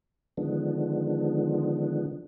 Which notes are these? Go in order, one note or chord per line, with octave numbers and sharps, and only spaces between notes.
D3 D#3 F3 G#3 B3 D4